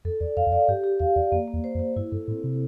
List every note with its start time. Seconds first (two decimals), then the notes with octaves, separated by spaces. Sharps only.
0.05 F2 A4
0.20 E2 D5
0.37 F2 F5
0.46 E2
0.52 F2 D5
0.68 G2 G4
0.84 G4
1.00 E2 F5
1.16 E2 D5
1.32 F2 A#3
1.48 A#3
1.53 E2
1.64 C5
1.75 F2
1.79 C5
1.96 G2 E4
2.12 G2 A4
2.28 A2 C4
2.43 C3 C4